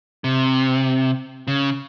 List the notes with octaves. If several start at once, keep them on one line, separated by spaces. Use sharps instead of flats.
C3
C#3